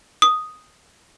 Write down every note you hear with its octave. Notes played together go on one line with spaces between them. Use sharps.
D#6